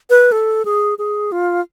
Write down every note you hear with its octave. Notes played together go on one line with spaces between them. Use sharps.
B4
A4
G#4
G#4
F4